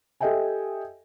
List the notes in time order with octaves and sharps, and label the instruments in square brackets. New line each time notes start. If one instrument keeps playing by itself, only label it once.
[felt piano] G4 A4 D#5 E5 G5 G#5